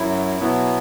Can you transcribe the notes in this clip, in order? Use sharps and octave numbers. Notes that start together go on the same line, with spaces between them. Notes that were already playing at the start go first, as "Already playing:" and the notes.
Already playing: F#2 F#3 E4
B2 F#3 B3 E4